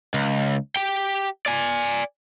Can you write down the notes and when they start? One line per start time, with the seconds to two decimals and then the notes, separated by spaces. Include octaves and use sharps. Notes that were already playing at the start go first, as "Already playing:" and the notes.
0.14 C#2
0.76 G4 G5
1.46 D5 G#5